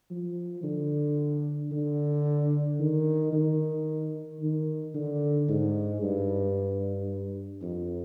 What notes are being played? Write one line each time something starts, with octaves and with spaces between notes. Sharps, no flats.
F3
D3
D3
D#3
D#3
D#3
D3
G#2
G2
F2